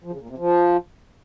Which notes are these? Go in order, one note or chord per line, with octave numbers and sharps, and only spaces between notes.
F3
C#3
A#2
C3
F3